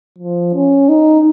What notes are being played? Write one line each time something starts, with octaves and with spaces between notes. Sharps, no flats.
F3
C#4
D#4